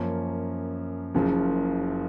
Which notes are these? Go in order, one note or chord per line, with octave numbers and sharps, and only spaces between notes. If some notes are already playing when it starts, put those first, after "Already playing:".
Already playing: F#2 F3 A#3 C#4
F#1 F#2 C#3 F3